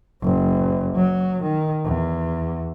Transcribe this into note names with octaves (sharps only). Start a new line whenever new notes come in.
F#1
F#3
D#3
E2